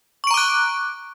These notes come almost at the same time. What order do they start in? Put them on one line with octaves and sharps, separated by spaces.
C#6 D7 A#5 D6 F#6